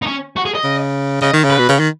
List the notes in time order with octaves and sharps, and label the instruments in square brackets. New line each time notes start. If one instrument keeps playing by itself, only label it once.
[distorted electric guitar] D#4
C#4
F#4
G#4
D#5
[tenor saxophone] C#3
[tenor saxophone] C#3 [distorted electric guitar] D#5
[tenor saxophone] D#3
C#3
[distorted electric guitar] B4
[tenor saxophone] B2
C#3
D#3